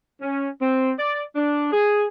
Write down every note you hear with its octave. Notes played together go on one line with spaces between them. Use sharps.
C#4
C4
D5
D4
G#4